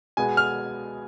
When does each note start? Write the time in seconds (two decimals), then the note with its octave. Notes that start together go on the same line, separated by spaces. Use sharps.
0.17 B2 G#3 B3 G#5
0.37 F6